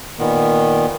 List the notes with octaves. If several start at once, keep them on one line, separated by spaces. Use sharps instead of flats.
A#2 D#3 B3